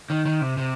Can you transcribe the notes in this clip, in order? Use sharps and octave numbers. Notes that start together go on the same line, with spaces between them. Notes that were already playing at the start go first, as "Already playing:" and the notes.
D#3
D#3
C3
C3